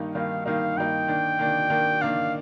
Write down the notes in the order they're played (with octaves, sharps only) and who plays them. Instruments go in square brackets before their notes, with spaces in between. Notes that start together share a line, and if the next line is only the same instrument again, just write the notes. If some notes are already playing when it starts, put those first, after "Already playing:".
Already playing: [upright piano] G2 D#3 A#3 D#4
[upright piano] G2 D#3 A#3 D#4 [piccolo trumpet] F5
[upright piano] G2 D#3 A#3 D#4 [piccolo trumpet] F5
[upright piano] G2 D#3 A#3 D#4 [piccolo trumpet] G5
[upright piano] D#3 A#3 D4
D#3 A#3 D4
D#3 A#3 D4
[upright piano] D#3 A#3 D4 [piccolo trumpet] F5